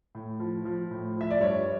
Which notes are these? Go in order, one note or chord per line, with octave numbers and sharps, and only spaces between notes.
A2
F3
F3
A2
F3 E5
D5
G2 C#5